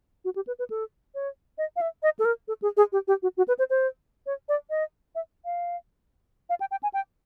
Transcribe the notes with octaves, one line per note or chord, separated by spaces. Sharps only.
F#4
G4
B4
B4
A4
C#5
D#5
F5
E5
D#5
A4
A#4
A4
G#4
G#4
G4
G4
F#4
F#4
B4
C5
C5
C#5
D5
D#5
E5
F5
F5
G5
G5
G#5
G5